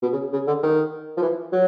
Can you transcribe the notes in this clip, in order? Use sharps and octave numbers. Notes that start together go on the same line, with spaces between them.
B2
C#3
C#3
D3
D#3
F3
E3
F#3